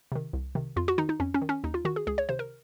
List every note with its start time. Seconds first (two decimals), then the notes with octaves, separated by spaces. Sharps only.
0.12 C3 D#3
0.33 C2
0.55 C3 D#3
0.76 F2 F4
0.88 F#4
0.98 D#3 D#4
1.09 D#4
1.20 F2 C#4
1.34 C#4
1.42 D#3
1.49 C#4
1.64 D#2 D#4
1.74 F4
1.85 D#3 F#4
1.96 G#4
2.07 C#2 G#4
2.18 C#5
2.29 C3 D#3 C5
2.39 A#4